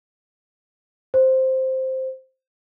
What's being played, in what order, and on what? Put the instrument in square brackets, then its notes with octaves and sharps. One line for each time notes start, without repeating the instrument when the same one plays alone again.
[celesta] C5